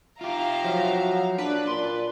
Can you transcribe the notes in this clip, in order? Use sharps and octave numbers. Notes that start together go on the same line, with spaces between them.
F4 G4 E5 F5 A#5
F3 F#3
A#1 D4 B4 D5
A#2 C6